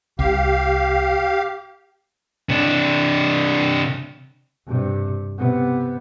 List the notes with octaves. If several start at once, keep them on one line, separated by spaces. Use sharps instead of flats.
C2 G4 F5
C3 D4
G2 C3
C3 B3